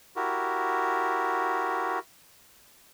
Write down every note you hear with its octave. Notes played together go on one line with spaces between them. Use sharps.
E4 F#4 G4 A#4